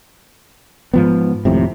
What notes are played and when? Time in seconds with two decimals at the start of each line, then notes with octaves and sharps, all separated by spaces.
0.94 G#2 F3 B3
1.45 G#1 F2 A2 C3